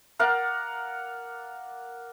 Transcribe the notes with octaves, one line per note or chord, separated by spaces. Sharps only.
A#4 D5 F5 F#5